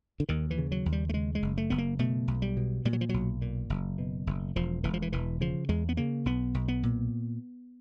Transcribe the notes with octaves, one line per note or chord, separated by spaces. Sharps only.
D3
D#2 D#3
E3
C#3
F#3
D#2
G3
A3
C#3 G#3
G#3
F#1
A3
F#1 B3
A#3
B2 A3
B1
G3
B2
A#2 G3
F#3
F3
B1 F#3
A#2
F#1
B2
F#1
E1 F3
E1 E3
F3
E3
E1 E3
C#3 F3
E2 G#3
B3
C#3 A#3
B1 B3
B1
B3
A#2